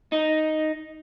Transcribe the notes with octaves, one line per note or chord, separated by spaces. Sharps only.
D#4